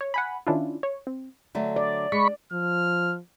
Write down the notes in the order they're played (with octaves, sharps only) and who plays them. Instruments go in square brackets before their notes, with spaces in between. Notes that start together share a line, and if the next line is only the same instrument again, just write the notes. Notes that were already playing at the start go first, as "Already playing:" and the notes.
[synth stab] C#5
F#5 G#5 B5
D#3 C#4 D4 E4 F4
C#5
C4
[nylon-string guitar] D3 F#3 A3
[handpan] D5
[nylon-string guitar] G#3 [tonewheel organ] B5 C#6
[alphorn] F3 [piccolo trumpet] F6